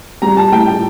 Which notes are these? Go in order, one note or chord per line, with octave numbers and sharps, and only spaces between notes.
G3 A#5
A5
A2 G5
G5